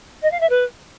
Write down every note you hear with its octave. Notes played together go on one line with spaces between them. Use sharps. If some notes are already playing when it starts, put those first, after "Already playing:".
D#5
F5
E5
B4